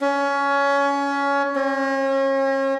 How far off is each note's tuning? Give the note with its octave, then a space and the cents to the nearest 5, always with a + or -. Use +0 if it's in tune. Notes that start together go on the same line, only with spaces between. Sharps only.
C#4 +20
C#4 -40